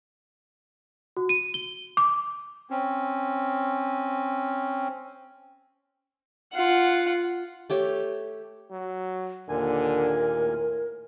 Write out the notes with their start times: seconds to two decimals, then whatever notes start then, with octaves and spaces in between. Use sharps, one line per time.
1.17 F#4
1.29 D#7
1.54 G7
1.97 D6
2.70 C4 C#4
6.53 F4 F#5
7.70 A3 G4 C#5
8.71 F#3
9.49 D#2 A#2 D3 A#4 G#5
10.35 A2